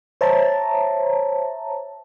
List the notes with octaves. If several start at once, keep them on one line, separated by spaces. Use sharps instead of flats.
C5 C#5 E5 A5 A#5